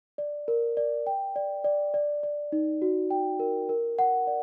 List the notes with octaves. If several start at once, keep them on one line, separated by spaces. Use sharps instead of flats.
D5
A#4
D5
G5
D5
D5
D5
D5
D#4
F#4
G5
A#4
A#4
F#5
D5